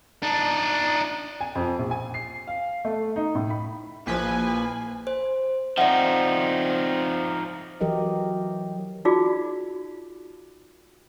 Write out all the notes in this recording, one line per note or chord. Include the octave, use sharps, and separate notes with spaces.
D4 D#4
G#5
F2
A#1
G#5
C7
F5
A3
D#4
A2
B5
A#1 E3 F3 A#3 B4 G#5
C5
F3 C4 D#4 D5 E5 F#5
E3 F#3 G4 A#4 D#5
D#4 F4 F#4 G#4 D5